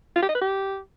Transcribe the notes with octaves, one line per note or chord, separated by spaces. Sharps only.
F4
G4
D#5
B4
G4